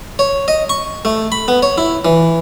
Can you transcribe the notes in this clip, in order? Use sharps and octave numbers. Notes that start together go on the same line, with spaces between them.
C#5
D#5
C#6
A3
B5
B3
C#5
E4
E3